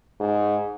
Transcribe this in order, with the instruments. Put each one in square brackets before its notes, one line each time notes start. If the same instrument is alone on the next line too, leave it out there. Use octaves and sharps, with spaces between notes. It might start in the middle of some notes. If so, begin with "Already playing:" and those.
[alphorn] G#2